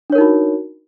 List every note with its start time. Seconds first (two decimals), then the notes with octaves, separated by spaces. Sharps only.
0.10 D4
0.12 C#5
0.15 A#4
0.18 D#4
0.21 F#4